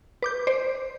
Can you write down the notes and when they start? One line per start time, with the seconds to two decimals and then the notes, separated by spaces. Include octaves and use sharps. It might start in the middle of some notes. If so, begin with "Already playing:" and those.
0.22 B4 D6 G6
0.47 C5 D5